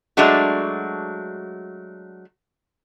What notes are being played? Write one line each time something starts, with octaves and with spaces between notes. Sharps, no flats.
F#3 G#3 A3 D4 F#4